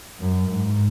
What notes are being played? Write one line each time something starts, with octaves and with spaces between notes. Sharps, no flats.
F#2
G#2